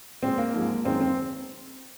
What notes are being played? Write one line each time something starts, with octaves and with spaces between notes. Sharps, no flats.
A#2 G#3 C4
A#3
G#2 F3 G#3
F#2 D#3 G#3 C4
C4